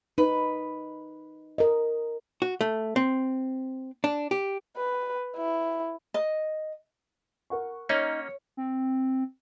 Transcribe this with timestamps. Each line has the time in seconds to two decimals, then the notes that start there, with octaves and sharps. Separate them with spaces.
0.18 D#4 B4
1.58 A#4 D#5
2.42 F#4
2.61 A3
2.96 C4
4.04 D4
4.31 G4
4.77 B4
5.37 E4
6.14 D#5
7.50 A#4 F#5 C#6
7.89 A#3 C#4 D#4 C#5
8.57 C4